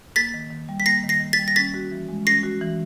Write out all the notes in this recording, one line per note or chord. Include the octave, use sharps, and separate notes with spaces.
A#3 A6 B6
D#3
D#3
G3
B6
A#3 A#6 C7
D#3
A#6 C7
D#3
A6 B6
G3
A#6
C#4 A6 B6
F#4
E3
G#3
C#4 A#6 C7
F#4
E3